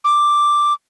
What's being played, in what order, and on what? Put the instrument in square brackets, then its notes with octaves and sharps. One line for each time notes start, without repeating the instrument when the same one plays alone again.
[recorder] D6